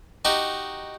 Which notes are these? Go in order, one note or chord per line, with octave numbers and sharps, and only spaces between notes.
D#4 F#4 G4